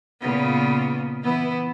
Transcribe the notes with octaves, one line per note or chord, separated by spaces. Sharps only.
A#2 C#3 B3
E3 B3 E4